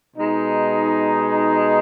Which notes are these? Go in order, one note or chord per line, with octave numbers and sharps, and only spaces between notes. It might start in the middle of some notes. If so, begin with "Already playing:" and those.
B2 G#3 D#4